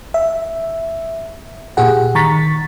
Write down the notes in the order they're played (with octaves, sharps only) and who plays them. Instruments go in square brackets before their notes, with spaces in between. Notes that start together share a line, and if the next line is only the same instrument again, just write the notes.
[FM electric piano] E5
A#2 G4 G#4 F#5
D#3 A#5 C#6 A6 B6